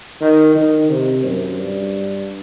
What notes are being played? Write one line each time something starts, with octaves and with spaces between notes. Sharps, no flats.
D#3
D#3
C3
F#2
G2